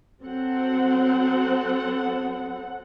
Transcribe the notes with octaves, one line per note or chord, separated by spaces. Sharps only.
F#3 C4 A4 F#5